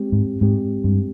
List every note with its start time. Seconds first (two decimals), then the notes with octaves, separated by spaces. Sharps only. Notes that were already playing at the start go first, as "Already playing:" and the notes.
Already playing: G#3 C4 G4
0.12 G#2
0.41 G#2 G#3 C4 G4
0.84 G2